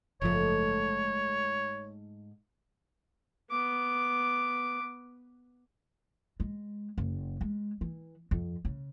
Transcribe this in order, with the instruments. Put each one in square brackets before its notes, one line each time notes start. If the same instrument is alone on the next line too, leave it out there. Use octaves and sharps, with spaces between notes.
[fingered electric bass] F#1 F3 [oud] G#2 A3 [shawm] C#5
[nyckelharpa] B3 D6
[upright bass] G#3
F#1
G#3
E3
F2
C#3